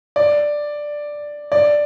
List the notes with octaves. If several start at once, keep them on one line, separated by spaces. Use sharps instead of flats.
D5
D5